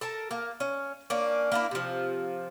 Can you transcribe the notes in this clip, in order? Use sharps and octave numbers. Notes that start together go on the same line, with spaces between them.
A4 A#4 A5
A#3
C#4
A#3 C#4 D4
A#3 D4 E4
C3 F3